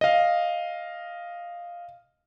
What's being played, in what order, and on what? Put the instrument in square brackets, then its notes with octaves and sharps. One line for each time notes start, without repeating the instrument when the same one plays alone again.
[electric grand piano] D#5 F5